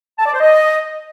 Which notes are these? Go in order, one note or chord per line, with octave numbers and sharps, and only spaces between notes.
A5
D5
C5
D#5